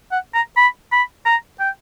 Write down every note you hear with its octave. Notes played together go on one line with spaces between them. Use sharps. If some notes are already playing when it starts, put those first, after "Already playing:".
F#5
A#5
B5
B5
A#5
G5